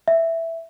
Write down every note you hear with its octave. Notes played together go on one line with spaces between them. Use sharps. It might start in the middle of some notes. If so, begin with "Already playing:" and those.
E5